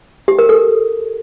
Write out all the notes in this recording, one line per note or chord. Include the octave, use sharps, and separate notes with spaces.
G4
A#4
A4